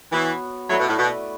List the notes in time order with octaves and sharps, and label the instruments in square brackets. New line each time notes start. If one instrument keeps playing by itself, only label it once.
[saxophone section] E3 [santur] B3 F#4 C#5
[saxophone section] F#3 [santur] A3 E4 B4 D5
[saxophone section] B2
A2
B2